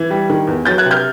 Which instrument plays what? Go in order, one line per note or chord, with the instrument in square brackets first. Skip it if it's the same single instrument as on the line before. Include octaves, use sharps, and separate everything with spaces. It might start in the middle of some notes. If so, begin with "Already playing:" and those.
Already playing: [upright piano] E3 G#6
G3
D#3
E2
F#3 G6 A6
F#6 G#6
C3
F6 G6